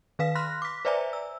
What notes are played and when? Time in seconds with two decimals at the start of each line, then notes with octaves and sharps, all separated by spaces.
0.19 D#3 B4 F5 B6
0.35 B5 C6 F6 F#6 A#6
0.62 D6 B6
0.85 B4 C5 D5 E5 G#5 A#5
1.13 E6